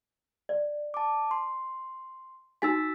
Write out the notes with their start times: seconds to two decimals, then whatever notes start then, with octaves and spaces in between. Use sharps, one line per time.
0.49 D5
0.94 A5 D6
1.31 C6
2.62 D#4 F#4 G#5 E6 A6 B6